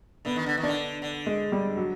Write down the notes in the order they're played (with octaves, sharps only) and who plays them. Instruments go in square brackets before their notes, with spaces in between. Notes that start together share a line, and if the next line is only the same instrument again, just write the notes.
[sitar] D3 [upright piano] B3
[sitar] D#3
D3
D#3
[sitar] D3 [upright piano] D4
[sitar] D3
[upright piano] G#3
G3
F#3